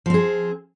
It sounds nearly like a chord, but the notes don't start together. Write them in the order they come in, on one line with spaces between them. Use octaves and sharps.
F3 C4 G#4